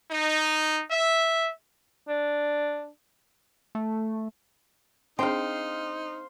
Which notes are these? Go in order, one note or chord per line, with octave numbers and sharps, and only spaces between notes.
D#4
E5
D4
A3
C4 D4 D#4 G#4 C5 F5 G5